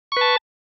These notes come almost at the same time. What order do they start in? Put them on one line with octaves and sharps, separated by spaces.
C#6 B4 A5